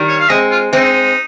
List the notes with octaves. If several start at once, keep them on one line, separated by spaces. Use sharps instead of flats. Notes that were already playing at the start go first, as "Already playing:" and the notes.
Already playing: D#3 G3
C#5
F5
G#3 C4 D#5
F4
G#3 C4 D#4